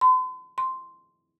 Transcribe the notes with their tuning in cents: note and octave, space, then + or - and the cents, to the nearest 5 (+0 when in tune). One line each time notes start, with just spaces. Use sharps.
C6 -45
C6 -5